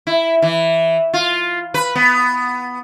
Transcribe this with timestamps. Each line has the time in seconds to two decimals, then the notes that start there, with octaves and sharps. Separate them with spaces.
0.07 E4
0.42 E3
1.13 F4
1.74 B4
1.95 B3